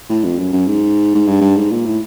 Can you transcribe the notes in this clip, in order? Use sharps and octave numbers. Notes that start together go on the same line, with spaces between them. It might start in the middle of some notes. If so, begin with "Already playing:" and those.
A2
F2
F#2
F#2
G#2
G#2
G2
G2
G#2
A#2
A2